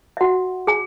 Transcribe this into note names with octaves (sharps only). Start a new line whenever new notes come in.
E5
F#4 F#5
G#4 G#5